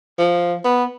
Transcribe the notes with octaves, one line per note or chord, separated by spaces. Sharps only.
F3
B3